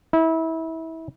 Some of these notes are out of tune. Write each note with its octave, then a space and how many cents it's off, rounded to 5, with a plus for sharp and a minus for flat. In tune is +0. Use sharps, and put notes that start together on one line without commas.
E4 -25